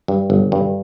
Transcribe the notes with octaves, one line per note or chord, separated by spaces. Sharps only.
G2
G1
G2